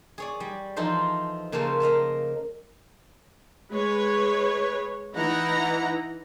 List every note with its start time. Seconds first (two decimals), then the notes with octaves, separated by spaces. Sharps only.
0.18 G#4 C#5 D5
0.40 G3
0.77 E3 F3 D#4 A4 C5
1.52 C#3 A#3 A4 C5 A5
1.80 A#3 D#5 F5 A5
3.72 G#3 B4 C#5
5.15 E3 D#4 E4 F#5 A#5